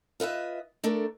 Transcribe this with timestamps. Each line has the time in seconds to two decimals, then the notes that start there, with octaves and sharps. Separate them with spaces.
0.20 F4 B4 D#5 E5
0.84 A3 D4 A4 A#4